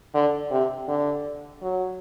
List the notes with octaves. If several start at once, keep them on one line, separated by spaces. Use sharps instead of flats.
D3
C3
D3
F#3